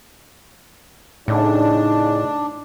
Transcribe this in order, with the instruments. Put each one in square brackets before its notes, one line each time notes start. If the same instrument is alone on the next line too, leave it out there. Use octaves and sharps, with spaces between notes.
[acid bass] A2 [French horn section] C#3 D#4 [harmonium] D4